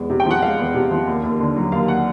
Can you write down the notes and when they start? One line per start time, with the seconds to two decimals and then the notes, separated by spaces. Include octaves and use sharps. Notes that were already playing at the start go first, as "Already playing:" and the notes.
Already playing: E2 G#3
0.10 C3
0.20 G5
0.26 F3 F#5
0.42 G#3 F5
0.59 E2
0.74 C3
0.91 F3
1.07 D#2
1.23 D#2
1.40 D3
1.56 F#3
1.72 D#2 F5
1.88 F#5